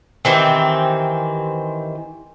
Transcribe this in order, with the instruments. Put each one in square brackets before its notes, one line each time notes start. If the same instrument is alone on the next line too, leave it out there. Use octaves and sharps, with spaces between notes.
[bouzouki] D#3 E3 C4 G4